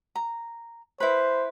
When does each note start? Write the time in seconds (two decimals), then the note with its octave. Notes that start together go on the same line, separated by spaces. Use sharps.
0.15 A#5
1.00 E4 B4 C5